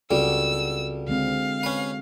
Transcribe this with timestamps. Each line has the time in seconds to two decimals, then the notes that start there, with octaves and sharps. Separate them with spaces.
0.11 C#2 G3 C4 F#4 A4 E6
1.08 D3 G#3 C4 F5
1.63 C#4 B4